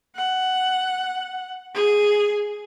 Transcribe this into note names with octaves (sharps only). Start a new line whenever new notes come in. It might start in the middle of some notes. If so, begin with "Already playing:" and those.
F#5
G#4